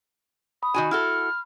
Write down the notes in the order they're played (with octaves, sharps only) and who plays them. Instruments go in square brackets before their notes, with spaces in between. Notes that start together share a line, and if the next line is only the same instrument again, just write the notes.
[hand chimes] B5 [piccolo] D#6
[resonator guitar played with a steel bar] D#3 F#4 G#5
[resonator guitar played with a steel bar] E4 F#4 A4 [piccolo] F6